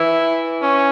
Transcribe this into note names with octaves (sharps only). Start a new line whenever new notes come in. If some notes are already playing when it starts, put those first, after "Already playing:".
Already playing: E3 E4
C#4